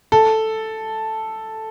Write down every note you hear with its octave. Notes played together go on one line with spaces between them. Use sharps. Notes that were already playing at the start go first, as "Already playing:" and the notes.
A4